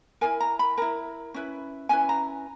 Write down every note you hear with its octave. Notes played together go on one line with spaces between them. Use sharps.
E4 A#4 G#5
A#5
B5
E4 A#4 A#5
C#4 E4 B4
C#4 E4 B4 G#5
A#5